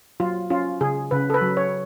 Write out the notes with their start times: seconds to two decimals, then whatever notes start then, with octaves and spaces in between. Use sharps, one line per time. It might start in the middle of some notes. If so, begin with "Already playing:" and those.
0.20 F#3 F4
0.50 C#4 F4
0.81 C#3 G#4
1.11 C#3 B4
1.30 A4
1.34 B4
1.41 F#3
1.57 C#5